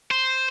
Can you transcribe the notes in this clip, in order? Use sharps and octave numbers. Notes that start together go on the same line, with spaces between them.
C5